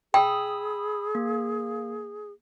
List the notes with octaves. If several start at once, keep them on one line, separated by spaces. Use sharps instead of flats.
G#4 G5 B5 D#6 E6
A#3